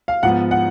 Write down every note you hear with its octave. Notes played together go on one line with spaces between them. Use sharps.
F5
G#2 F3 B3 F#5
F#5